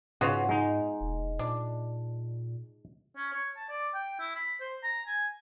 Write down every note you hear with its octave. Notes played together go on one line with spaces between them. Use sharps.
G#2 C#3 B3 F4 F#4
G#3 D#4
E1
A#2 D4
C#4
C#5
A5
D5
G5
E4
B5
C5
A#5
G#5